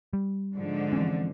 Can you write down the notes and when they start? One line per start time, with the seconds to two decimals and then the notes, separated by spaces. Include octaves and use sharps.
0.13 G3
0.55 G#2 D3 F3
0.93 E3 C4 C#4